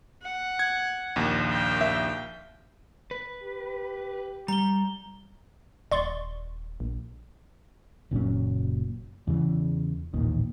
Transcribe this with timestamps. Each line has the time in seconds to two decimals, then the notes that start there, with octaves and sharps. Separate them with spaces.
0.23 F#5
0.59 G#6
1.16 A#1 D#2
1.46 F5 G5
1.81 E5
3.11 B4
3.43 G4
4.48 G3 A#5 G7
5.91 D#1 D5 C6 C#6
6.80 A#1
8.11 F#1 A#2 F#3 C#4
9.27 E2 C#3 E3
10.14 A1 D#2 A#2 D#3